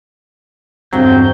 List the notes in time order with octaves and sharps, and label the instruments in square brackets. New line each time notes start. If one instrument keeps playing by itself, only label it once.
[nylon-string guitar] E2 G2 D3 [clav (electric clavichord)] F#3 [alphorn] C4 [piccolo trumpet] G6